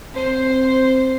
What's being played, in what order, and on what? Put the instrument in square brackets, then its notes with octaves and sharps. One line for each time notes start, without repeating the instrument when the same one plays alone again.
[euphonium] C4 [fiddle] C5